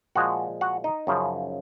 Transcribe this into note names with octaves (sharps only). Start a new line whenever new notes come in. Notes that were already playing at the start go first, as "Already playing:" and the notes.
A#2 F3 G#3 F#4 F#5
F#4 F#5
D#4 D#5
F#2 C#3 F3